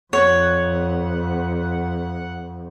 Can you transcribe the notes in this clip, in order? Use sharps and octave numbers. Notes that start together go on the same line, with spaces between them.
F2 C#5 F#5